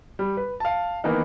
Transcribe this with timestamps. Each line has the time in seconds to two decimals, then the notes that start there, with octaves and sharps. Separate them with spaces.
0.19 G3
0.37 B4
0.60 F5 A5
1.04 D#3 E3 A#3 B3 D#4